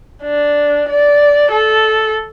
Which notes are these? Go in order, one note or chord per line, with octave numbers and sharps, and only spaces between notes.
D4
D5
A4